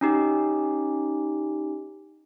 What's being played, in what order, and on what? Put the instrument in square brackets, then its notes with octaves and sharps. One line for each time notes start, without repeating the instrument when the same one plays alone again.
[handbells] C#4 D#4 G4